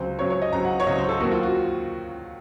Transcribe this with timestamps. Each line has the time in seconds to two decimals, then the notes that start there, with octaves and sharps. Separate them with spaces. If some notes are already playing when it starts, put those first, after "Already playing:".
Already playing: C#2 C#3 F#3 C4 C5
0.19 C#2 C#3 F#3 C4 C#5
0.30 C#5
0.42 D#5
0.53 C#2 C#3 F#3 C4 A#5
0.65 F#5
0.80 C#5
0.86 C#2 C#3 F#3 C4 D#5
0.98 C5
1.09 A4
1.20 D#2 D#3 F#3 C4 F#4
1.32 F4
1.43 F#4